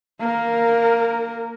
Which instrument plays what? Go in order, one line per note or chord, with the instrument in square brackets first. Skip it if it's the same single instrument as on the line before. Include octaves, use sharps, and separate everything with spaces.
[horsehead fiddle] A#3 A#4